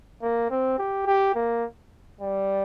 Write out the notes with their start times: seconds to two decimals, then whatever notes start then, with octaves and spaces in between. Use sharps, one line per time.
0.22 A#3
0.50 C4
0.78 G4
1.06 G4
1.35 A#3
2.21 G3